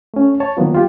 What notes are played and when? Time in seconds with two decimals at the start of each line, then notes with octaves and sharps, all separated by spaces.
0.14 A3 C#4
0.40 C#5 A5
0.57 D#3 F#3 A#3 B3 F4
0.75 F4 G4